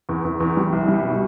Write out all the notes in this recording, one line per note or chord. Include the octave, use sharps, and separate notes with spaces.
E2
E2
E2
G3
C2
G3
B2